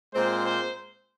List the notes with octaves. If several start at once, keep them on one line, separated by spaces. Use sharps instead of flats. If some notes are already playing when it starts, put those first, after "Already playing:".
A#2 G#3 C4 C5
C5